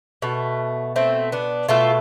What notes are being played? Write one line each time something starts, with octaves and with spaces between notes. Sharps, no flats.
B2 A3
A3 C4
B3 D4
B2 A3 F4 A4